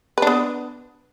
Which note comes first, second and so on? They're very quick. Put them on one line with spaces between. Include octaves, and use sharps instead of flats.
B4 D4 B3